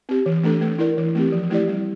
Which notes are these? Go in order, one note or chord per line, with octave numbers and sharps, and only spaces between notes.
C4 G4
E3
A3 D4 A4
A3
E4 A#4 D5
E3
A3 C4 G4
F3
A3 E4 G4 D5
G3